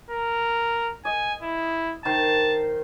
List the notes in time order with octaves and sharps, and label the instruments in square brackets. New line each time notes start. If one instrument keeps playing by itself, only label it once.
[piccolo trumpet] A#4
[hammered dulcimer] D#5 [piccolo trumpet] G#5
[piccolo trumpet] E4
[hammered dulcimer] D#3 C5 [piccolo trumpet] A5